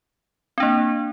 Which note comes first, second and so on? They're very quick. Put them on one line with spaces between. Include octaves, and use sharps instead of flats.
C4 D4 A#3